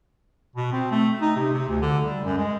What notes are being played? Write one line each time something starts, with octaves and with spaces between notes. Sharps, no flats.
B2
C4
A3
D#4
C3
C3
D2
D3
G3
F#2
G#3